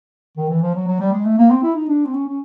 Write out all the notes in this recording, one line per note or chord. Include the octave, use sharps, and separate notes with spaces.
D#3
E3
F3
F#3
F#3
G3
G#3
A3
A#3
C4
E4
D#4
D4
C4
C#4
C#4